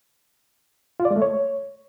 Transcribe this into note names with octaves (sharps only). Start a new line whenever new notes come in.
F4
D5
G#3
A3
C#5